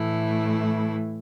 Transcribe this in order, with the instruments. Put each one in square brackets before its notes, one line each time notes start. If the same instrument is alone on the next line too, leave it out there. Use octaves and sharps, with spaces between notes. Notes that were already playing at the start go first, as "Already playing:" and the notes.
Already playing: [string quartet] A2 E3 A3 E4